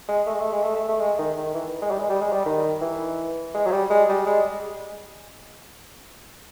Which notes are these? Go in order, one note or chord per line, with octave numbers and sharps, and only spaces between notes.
G#3
A3
G#3
A3
G#3
A3
A3
A3
G#3
D#3
D#3
E3
G#3
G3
G#3
G3
G#3
G3
D#3
E3
G#3
F#3
G3
G#3
G3
G#3